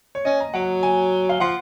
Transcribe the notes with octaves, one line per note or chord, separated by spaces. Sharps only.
C#5
C#4 D#5
A#5
F#3 F#5
G#5
F5
F3 F#5